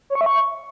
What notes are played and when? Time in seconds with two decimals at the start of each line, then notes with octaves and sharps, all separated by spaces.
0.10 C#5
0.15 C#6
0.21 E5
0.26 C#6